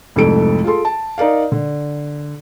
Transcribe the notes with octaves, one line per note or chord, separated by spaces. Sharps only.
C2 F2 G#2 A3 A4 D7
F4 G#4 A4 C6
A5
D#4 A#4 D5 F5
D3